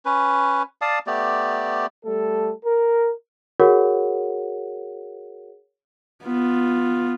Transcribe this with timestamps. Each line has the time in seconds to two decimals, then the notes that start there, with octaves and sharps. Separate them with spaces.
0.05 C#4 B4
0.81 D5 F5 A5 D#6
1.07 A3 B3 G4 D5
2.04 G3 A3 A4
2.64 A#4
3.60 F#4 G#4 A#4 C#5 F#5
6.25 B3 F4